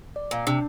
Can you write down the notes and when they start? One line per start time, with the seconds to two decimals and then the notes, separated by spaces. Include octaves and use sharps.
0.16 D5
0.31 A#2
0.47 C3 D4